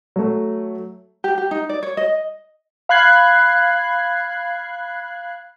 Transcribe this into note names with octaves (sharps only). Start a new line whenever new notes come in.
F#3 A3
G4
G4
D#4
D5
C#5
D#5
F5 B5 F#6 G#6 C7